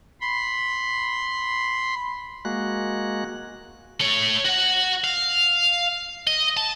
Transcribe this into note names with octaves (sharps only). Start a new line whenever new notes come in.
B5 C6
G#3 A#3 F#4 F#6
A3 C#5
F#4 F#5
F5
D#5
A5